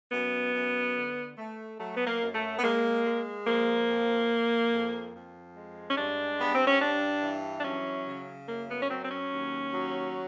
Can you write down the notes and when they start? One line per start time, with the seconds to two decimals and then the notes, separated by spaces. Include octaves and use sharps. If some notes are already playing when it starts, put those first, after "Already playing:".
0.11 F#2 B3
0.53 F#2
0.96 D3
1.37 A3
1.79 F#3 A3
1.96 B3
2.07 A#3
2.21 F#2
2.35 A3
2.58 B3
2.63 G#3 A#3
3.04 G#3
3.46 F3 A#3
3.88 F2
4.30 F2
4.71 F2
5.14 F2
5.56 G#3
5.89 C#4
5.97 G2 D4
6.38 G2 B3
6.54 C4
6.67 C#4
6.80 G2 D4
7.23 E3
7.58 D4
7.64 F#3 C#4
8.06 C#3
8.48 F#2 A#3
8.69 B3
8.80 C#4
8.89 F#3 C4
9.04 C4
9.11 C#4
9.31 D#2
9.74 F#3